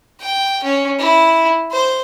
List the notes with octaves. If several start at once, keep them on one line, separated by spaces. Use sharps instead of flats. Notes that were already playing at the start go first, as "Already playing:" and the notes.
G5
C#4
E4
C5